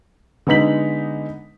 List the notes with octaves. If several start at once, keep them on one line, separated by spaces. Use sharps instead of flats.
D3 G#3 B3 D#4 B6 F#7